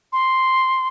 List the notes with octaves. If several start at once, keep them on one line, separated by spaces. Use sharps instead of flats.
C6